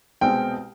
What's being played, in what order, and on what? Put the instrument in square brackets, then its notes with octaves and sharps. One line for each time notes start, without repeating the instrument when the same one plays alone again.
[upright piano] C2 B2 G#3 C4 G5